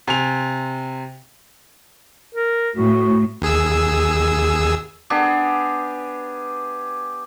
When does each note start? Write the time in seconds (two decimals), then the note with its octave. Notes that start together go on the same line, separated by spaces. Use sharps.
0.08 C3 G#5 F7
2.35 A#4
2.76 A2 F#4
3.42 D#2 G#4 E6
5.10 B3 D4 G4 G#4